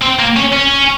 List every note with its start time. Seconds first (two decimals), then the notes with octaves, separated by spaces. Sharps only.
0.02 C4
0.19 A#3
0.36 C#4
0.52 C#4